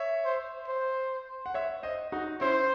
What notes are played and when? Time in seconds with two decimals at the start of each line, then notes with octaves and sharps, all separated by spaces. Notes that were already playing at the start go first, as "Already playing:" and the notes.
Already playing: C#5 E5
0.25 C5
0.68 C5
1.46 F#5
1.54 C#5 E5
1.83 C5 D#5
2.12 D#4 F#4
2.41 C#4 E4 C5